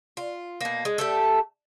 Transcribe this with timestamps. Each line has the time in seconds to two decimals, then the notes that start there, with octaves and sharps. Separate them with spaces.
0.17 F4
0.61 B2 A#3
0.85 G#3
0.98 A3 G4 A4